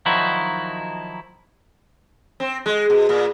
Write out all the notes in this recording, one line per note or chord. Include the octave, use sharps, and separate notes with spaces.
D#3 F3 F#3 D#4 E4 F#4
C4
G#3
B2
A#2